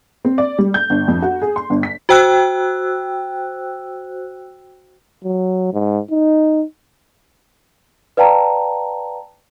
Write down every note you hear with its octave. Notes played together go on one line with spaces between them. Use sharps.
C4
D5
G3
G6
G1
F2
F#4
G#4
C6
G1
B6
F#4 C5 G5 E6 F#6
F#3
G#2
D#4
B4 D5 F5 G5 A5 A#5